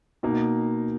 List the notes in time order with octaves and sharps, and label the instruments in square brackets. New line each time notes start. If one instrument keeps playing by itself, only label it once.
[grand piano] B2 A#3 D#4